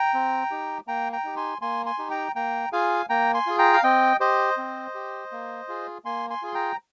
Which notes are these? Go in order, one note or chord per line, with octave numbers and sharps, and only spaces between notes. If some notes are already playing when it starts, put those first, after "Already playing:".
Already playing: G5 A#5
C4
D#4 G4
A#3 G5 A#5
G5 A#5
D#4 G4
G#5 C6
A#3 G#5 C6
G#5 C6
D#4 G4
G5 A#5
A#3 G5 A#5
F4 G#4 F5 G#5
A#3 G5 A#5
G#5 C6
F4 G#4
G5 A#5
F5
C4 D#5 G5
G4 C5 D#5
C4
G4
A#3
F4 G#4
A#3 G#5 C6
G#5 C6
F4 G#4 C6
G5 A#5